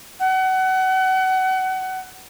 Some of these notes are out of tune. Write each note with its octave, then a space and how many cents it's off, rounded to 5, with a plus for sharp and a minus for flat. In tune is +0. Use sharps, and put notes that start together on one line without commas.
F#5 +30